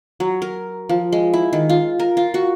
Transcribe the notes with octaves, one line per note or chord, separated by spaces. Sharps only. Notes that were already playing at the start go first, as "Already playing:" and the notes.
F#3
A#4
F3
G#3
E4
D#3
F4
A#4
F4
F#4